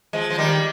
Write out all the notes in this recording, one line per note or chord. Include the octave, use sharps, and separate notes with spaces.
F3 G#3
F3
D#3 G3